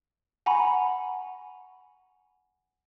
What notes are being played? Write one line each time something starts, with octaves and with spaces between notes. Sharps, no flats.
F#5 G#5 A#5 B5 C#6